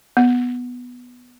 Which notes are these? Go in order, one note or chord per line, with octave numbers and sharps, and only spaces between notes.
B3